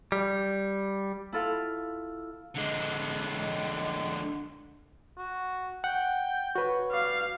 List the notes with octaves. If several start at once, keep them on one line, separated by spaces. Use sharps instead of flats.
G3
E4 F4 A4 F5
D3 G#3
F#4
F#5 G5
F#4 B4 C#5
G3 F5